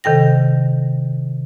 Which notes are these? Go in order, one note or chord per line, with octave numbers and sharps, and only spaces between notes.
C3 D#3 A4 G5 A#6